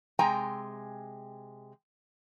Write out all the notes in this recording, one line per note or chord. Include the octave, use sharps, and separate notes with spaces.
C3 G#3 G5 G#5 A#5